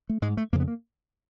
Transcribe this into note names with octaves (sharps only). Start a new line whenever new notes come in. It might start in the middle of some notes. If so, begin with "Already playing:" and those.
A3
G#2 G#3
A3
F2 C#3 A#3
B3
A#3